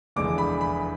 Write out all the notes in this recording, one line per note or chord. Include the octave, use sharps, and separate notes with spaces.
F1 E2 D3 G#3 D4 D6
B5
B5